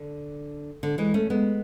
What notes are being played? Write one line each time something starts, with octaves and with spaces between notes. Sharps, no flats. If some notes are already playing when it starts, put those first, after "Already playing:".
Already playing: D3
D3
E3 G#3
A3 C#4
G#3 B3